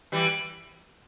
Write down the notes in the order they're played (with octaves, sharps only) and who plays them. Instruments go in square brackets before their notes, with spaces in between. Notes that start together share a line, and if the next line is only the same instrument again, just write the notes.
[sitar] E3 G3